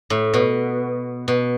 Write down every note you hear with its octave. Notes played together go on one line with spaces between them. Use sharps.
A2
B2
B2